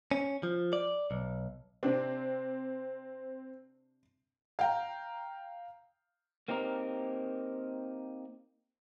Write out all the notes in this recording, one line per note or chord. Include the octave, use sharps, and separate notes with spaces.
C#4
F3
D5
B1
C3 C4 D4
F5 G5 A#5
A#3 C4 D#4 G4 A#4